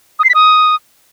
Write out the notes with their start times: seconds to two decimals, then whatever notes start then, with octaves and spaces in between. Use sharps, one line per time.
0.19 D#6
0.24 C7
0.29 B6
0.35 D#6